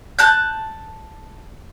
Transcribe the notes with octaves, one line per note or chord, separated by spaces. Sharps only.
A5 F#6 G6